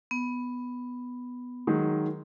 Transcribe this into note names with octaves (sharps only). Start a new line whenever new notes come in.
B3
D#3 F#3 G#3